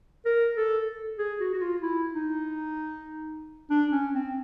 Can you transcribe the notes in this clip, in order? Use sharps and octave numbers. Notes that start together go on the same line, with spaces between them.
A#4
A4
G#4
F#4
F#4
F4
E4
D#4
D4
C#4
C4